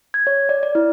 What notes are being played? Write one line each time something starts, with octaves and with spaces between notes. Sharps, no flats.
G#6
C#5
D5
D5
E4